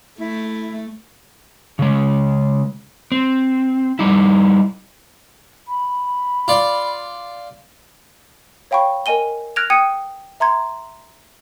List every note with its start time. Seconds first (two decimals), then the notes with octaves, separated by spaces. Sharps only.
0.20 A3 E4
1.79 C#3 G#3
3.12 C4
3.99 G3 D#4 E4
5.68 B5
6.48 F4 D5
8.71 C#5 F5 G5 B5 C#6
9.06 A#4 D#5 G#5 D#7 G7
9.56 F6 F#6 G#6 A#6 D7 F7
9.70 G5 D#6 G#6 C#7 D#7
10.40 E5 A#5 C6 G#6